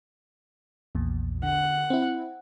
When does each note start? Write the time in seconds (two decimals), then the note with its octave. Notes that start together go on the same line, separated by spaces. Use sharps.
0.95 A#1 E2 A#2
1.43 D3 F#5
1.90 C4 E4